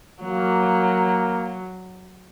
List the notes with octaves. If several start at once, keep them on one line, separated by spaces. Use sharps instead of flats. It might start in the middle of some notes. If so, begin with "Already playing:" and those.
F#3 A#3